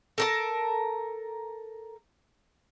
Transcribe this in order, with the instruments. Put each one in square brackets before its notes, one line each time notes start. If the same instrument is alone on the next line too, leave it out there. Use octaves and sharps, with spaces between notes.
[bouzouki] A4 A#4 A5